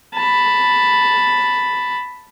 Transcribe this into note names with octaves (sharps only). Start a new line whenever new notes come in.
A5 B5